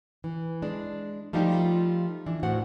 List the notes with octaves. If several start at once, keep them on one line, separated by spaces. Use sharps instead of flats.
E3
G#3 D4
F3 G3 A3 D#4 F4 G4
E3 D4
A2 E3 F#4 C5 F#5